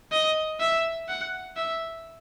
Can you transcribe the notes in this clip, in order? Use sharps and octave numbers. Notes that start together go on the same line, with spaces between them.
D#5
E5
F#5
E5